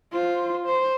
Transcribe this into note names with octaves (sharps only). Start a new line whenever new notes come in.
F4 C5
C5